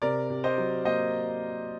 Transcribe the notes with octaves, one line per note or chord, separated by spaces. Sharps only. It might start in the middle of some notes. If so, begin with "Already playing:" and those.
C3 A#4 D5
C3
C5 D#5
F#3
A#3 C5 D#5